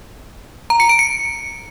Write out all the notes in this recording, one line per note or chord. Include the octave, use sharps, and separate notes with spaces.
A#5
C#7
D7
C#7